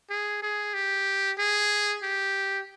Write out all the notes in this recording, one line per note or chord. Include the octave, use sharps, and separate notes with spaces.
G#4
G#4
G4
G#4
G4